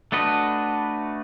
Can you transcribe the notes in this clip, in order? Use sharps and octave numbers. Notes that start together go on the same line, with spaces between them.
A3 D4 F#4 B4 D#5